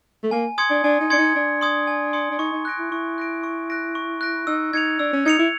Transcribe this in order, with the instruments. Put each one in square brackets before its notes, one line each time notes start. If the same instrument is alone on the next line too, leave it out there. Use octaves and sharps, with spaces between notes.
[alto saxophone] A3
[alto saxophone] A#3 [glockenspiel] G#5
[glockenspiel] C6 D#6 G#6 C#7
[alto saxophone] D4
[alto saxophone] D4 [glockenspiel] G#5
[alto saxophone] D#4
[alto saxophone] D4 [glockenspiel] C6 D#6 G#6 C#7
[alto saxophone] D#4
[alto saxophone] D4 [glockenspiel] G#5
[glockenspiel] C6 D#6 G#6 C#7
G#5
C6 D#6 G#6 C#7
[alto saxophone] D4
[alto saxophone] D#4 [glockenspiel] C#6
[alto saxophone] D#4
[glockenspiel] F#6 A#6 D7
[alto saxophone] E4
[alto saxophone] E4 [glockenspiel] C#6
[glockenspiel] F#6 A#6 D7
C#6
F#6 A#6 D7
C#6
F#6 A#6 D7
[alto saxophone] D#4 [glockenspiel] E6
[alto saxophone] D#4 [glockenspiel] G#6 C#7 F7
[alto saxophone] D4 [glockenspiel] E6
[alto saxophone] C#4
[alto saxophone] D#4 [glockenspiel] G#6 C#7 F7
[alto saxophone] E4